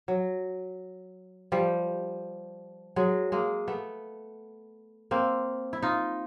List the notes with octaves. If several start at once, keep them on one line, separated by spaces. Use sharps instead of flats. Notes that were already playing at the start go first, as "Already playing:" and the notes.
F#3
F3 G3
F#3 G#3
G#3 A#3
A3 B3
A#3 C4
E4
D#4 F4